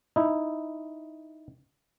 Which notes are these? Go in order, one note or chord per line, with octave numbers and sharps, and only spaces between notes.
D#4 E4